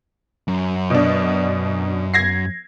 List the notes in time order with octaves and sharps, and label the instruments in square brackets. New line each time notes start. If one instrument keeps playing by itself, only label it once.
[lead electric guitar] F#2
[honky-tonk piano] B2 D4
G#6 A#6 C7